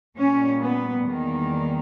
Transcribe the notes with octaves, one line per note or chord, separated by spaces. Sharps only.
A#2 G3 C#4
B3
E2 D#3 G3 A#3